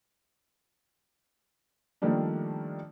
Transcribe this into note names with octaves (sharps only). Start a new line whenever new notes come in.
D#3 F3 G3 A3 A#3 D4